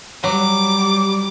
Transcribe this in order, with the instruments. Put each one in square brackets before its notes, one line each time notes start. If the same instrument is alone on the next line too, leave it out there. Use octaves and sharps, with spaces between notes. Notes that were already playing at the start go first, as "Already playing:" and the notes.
[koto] F#3 [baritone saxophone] G3 [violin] D6